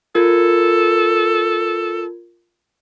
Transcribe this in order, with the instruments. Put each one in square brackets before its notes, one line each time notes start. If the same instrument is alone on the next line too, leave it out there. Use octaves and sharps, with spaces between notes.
[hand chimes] F4 A#4 G#6 [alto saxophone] A4